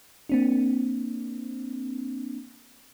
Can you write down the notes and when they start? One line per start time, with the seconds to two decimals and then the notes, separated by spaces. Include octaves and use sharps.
0.29 A#3 C4 D4